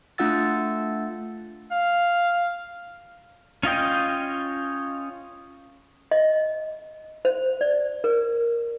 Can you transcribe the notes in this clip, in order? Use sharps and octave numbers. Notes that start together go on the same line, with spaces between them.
A3 D4 F4 F#5 E6 A6
F5
C#4 F4 D#5 G5
D#5
C5
D5
A#4